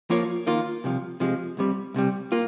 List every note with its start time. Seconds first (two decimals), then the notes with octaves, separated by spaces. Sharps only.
0.10 F3 A#3 F4 A#4 C#5
0.47 D#3 A#3 F4
0.84 C2 C3 F3
1.20 C3 F3 G#3
1.57 C2 C3 G3
1.94 C2 C3 G3
2.32 A#3 F4